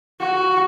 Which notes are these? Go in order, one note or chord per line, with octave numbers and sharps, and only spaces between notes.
F#4